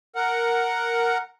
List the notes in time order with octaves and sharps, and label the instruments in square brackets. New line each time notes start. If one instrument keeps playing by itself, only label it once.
[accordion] A#4 F#5